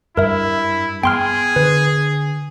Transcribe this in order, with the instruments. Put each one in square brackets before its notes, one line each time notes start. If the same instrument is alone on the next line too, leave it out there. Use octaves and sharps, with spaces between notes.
[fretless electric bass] G2 [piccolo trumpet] E4 [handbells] A#4 E5
[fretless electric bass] B3 [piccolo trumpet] G#4 [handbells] G5 C6 F6
[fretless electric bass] D3 [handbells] B4